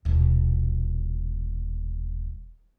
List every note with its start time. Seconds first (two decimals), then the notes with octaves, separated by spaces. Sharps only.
0.05 D#1 B2